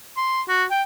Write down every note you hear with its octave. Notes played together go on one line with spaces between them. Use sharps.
C6
F#4
G5